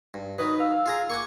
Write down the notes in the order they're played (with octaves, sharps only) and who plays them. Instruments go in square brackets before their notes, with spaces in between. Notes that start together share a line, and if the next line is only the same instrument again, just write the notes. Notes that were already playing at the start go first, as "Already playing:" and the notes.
[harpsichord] G2
[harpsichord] D#3 F#3 [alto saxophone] B4 [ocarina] D#6
[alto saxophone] F5 [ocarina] E6
[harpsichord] F4 G#4 A#5
[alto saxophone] A#3 [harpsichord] F#5 G#5 C#6 [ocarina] D6